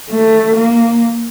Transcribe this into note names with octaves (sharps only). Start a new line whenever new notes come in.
A3
A#3